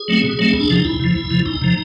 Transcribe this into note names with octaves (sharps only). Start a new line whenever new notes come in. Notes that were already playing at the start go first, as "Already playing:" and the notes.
Already playing: G#4
F#3 A3 C4
B2
F#3 A3 C4
E2
D4
C3 F3 D#4
E2 E4
C3 F3
E2
C3 F3
E2 D#4
C3 F3